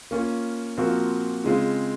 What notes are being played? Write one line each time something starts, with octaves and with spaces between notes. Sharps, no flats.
A#3 C#4 F4
A#2 F3 C4 F#4 A#4
C#3 G#3 C4 F4